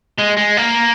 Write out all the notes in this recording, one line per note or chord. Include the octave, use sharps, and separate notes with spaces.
G#3
G#3
A#3